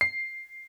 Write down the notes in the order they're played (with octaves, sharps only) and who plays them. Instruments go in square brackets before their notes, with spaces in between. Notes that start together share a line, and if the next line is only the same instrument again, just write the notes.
[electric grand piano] C7